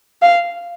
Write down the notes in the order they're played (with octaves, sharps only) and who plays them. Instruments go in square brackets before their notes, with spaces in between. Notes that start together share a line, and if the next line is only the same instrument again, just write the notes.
[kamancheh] F5